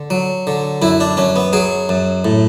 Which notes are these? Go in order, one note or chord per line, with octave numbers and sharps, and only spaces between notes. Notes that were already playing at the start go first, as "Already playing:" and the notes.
Already playing: D3
F#3
D3
F#2 E4
D4
F#2 C#4
B3
F#3 G#4
F#2
A2